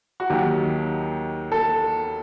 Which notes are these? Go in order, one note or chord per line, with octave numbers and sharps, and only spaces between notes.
F#4
D#2 D#3 F#3 G4
A4